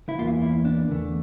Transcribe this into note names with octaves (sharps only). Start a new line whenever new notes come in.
E4
E2 E3 A#3 F4
E4
D4
E2 D3 A3